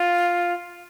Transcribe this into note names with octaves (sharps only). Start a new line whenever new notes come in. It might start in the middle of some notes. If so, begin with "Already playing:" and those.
Already playing: F4